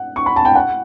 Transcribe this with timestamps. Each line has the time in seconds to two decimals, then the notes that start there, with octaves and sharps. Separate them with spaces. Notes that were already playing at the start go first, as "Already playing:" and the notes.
Already playing: F#5
0.16 C#6
0.26 B5
0.36 A5
0.45 G5
0.55 F#5